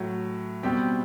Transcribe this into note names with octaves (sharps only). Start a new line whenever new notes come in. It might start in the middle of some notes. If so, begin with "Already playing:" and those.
Already playing: A2 F#3 F#4
B2 G3 C4 G4